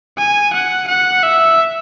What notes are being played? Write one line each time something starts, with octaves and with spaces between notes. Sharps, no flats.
G#5
F#5
F#5
E5